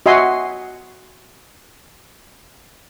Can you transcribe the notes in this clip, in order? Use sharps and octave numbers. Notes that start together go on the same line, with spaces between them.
F#4 D#5 E5 G#5 C6